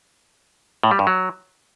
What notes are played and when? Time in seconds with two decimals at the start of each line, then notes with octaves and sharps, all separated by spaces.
0.83 A2
0.91 G3
0.99 G2
1.07 F#3